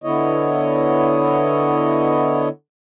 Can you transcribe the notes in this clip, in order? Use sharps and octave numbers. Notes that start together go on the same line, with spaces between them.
D3 B3 E4 C#5 D#5